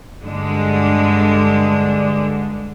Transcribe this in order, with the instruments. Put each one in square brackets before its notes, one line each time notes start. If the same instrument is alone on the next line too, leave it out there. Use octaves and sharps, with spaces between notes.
[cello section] G2 D3 G#3 D4